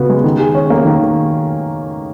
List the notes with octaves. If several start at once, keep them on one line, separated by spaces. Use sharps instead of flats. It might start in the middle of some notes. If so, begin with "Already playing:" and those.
Already playing: C#3 B3 F#4
G#3
D#3
G#4
C#4
A#3
D#3